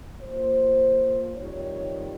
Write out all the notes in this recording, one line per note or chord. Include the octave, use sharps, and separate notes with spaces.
A#2 F3 A#3 C5
F2 D#3 G3 C#5